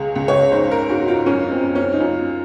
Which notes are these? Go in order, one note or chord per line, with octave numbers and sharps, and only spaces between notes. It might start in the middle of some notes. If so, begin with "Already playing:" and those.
Already playing: C#2 G#4
C#2
C#5
G#2 C5
A#4
G#2 F#4
F4
F#2 C#4
C4
F#2
C#4
D#4
F#2 F4